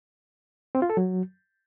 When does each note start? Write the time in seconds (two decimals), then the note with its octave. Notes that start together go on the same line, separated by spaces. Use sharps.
0.75 C4
0.82 F4
0.90 A4
0.97 F#3